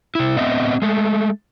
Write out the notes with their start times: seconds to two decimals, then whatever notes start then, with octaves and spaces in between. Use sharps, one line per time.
0.15 C3 E4
0.37 B3 C4 D#5 E5
0.82 G#3 A3